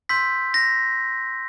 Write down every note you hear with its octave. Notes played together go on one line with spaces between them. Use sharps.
C6 E6 G6 B6
A#6